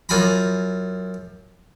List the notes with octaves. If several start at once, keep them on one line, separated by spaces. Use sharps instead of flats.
F#2 F4 G#5 A#5 B5